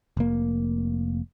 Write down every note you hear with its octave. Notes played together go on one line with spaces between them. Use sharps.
F1 A#3